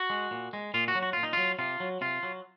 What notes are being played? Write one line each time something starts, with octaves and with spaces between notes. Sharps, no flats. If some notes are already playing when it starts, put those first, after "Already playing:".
Already playing: F#4
G#3
A#2
G#3
A#2 F4
F#4
F#3
F#4
A#2 F4
D#4
F#3 F4
C3 F4
F#3
C3 F4
F#3